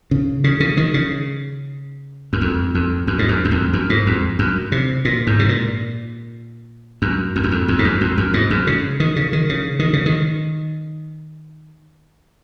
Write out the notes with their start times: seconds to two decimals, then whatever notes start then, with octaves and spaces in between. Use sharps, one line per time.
0.11 C#3
0.44 C#3
0.60 C#3
0.77 D#3
0.94 C#3
2.33 F#2
2.41 F2
2.75 F2
3.07 F#2
3.19 G#2
3.29 F#2
3.45 F#2
3.51 F2
3.73 F#2
3.90 G#2
4.07 F2
4.39 F#2
4.72 C3
5.05 A#2
5.27 G#2
5.39 C3
5.49 A#2
7.02 F#2
7.36 F2
7.44 F#2
7.52 F2
7.68 F2
7.79 G#2
7.85 F#2
8.01 F2
8.18 F#2
8.34 G#2
8.50 F#2
8.67 C#3
9.00 D#3
9.16 C#3
9.33 D#3
9.49 C#3
9.79 D#3
9.93 C#3
10.06 D#3